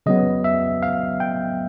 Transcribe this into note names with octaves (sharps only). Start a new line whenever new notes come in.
C#3 F#3 B3 D#5
E5
F5
G5